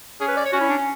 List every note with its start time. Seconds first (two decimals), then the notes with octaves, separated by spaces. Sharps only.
0.20 C#4 G#4
0.28 B4
0.37 D5
0.45 C#5
0.53 C#4 F#4
0.61 E4
0.70 D4
0.78 C#4